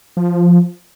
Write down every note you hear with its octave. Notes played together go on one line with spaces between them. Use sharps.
F3